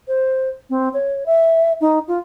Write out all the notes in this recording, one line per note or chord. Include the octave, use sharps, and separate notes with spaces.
C5
C4
C#5
E5
D#4
F4